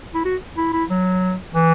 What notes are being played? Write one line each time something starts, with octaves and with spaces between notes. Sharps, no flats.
E4
F#4
E4
E4
F#3
E3